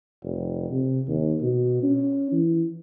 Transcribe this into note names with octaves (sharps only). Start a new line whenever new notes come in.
F1
C3
D#2
B2
C#4
E3